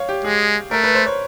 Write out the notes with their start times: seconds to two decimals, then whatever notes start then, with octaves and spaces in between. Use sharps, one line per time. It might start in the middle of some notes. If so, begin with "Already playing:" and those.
Already playing: C#5 F5
0.09 G4
0.24 G#3 G#4
0.71 A3 A#4
0.84 B4
0.95 C5
1.06 C#5